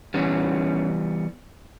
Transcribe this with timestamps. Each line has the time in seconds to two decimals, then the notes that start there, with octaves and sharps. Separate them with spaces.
0.14 E3 G3 B3 C#4